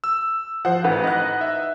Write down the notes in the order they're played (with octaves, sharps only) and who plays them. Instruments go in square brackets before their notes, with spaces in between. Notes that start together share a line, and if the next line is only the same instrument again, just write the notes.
[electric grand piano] E6
[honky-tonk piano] F3 [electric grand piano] C5 F#5
[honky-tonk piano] A1 [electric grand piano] D#4 B4 F#5
[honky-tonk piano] D#5 F#6
[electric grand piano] E5